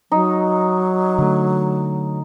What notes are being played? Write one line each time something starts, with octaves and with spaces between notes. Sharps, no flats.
F#3 D#4
D3 A3